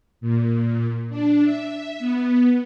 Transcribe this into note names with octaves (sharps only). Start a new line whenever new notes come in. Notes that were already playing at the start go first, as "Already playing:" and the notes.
A#2
D4
E5
B3